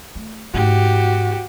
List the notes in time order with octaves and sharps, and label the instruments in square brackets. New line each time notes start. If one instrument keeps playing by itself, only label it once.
[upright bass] A3
[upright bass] G#2 A3 [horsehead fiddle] F#4 G4